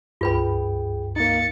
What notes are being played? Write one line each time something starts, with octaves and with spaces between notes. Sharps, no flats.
C#2 G2 F4 G#4 B4 G5 B5
A#3 D#4 A6 C#7